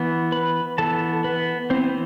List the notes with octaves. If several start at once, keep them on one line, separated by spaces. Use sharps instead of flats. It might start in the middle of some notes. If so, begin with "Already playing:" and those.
Already playing: E3 B3
B4 B5
E3 B3 A4 A5
B3 B4
E3 B3 C4 C5